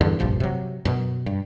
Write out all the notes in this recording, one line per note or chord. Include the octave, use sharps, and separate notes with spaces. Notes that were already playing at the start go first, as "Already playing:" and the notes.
E2 G2 D3
F1 A#1 G2 F3
C3 F#3
F#2 B2
G2